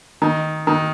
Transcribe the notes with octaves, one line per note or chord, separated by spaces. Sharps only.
D#3
D#3